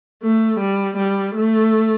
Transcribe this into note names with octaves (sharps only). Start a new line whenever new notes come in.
A3
G3
G3
A3